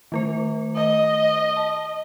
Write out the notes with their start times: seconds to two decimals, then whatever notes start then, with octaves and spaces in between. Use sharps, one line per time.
0.12 D#3 A3 C5
0.76 D#5
1.57 A5